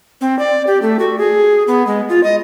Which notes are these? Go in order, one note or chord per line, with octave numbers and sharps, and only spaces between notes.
C4
D5
G4
A3
F#4
G#4
B3
G#3
F4
D#5